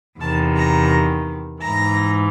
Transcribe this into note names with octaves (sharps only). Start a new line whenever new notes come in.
E2 C3 D#3 A5
A#5
G#2 E3 A#5